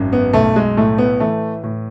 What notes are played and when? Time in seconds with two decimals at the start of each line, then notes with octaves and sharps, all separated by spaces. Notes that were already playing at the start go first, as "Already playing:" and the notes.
Already playing: G#1 F#2
0.13 B3
0.33 B1 A3
0.56 G#3
0.77 A2 A3
0.98 B3
1.20 E3 A3
1.63 A2